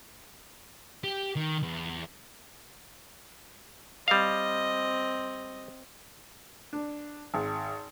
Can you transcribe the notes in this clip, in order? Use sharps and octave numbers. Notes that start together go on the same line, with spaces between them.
G4
D#3
E2
G3 C4 D#5 F5
D4
G#1